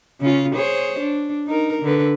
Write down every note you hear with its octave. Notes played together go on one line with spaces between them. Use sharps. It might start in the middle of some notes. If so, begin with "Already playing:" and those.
C#3 C#4 F4
G#4 C5 C#5
D4
D#4 A#4
D3 B4